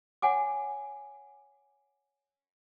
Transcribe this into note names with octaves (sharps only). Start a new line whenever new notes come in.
C#5 F#5 G#5 D6